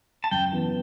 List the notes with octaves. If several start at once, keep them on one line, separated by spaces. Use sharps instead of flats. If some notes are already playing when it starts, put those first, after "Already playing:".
A5
F#2 G5
E3 B3